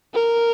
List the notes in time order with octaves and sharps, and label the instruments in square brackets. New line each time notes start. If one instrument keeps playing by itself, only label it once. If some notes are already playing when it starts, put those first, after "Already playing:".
[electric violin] A#4